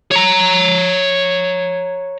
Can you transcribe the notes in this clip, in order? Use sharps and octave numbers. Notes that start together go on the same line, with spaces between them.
C#5 A#5